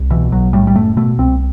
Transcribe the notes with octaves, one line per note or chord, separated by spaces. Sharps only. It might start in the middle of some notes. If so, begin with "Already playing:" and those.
Already playing: C2
B2 E3
B1 F#3
A2 G3
G3
F#1 A3
B2 A3
C2 C4